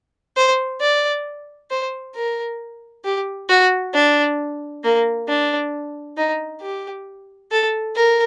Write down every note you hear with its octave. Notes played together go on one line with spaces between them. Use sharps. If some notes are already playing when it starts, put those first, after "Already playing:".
C5
D5
C5
A#4
G4
F#4
D4
A#3
D4
D#4
G4
A4
A#4